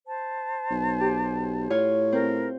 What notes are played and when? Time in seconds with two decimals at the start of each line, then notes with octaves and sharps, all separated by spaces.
0.07 C5 A5
0.70 B1
1.01 G4
1.70 A2 F4 C#5
2.12 C4 A#4 C5